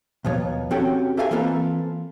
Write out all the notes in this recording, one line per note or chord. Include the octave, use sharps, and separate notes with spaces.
D#2 B2 F3 C#5
C4 C#4 F#4 G4 A4 C#5
G4 A4 E5 F5 G5 G#5
E3 A#3 C4 F4 A4 B4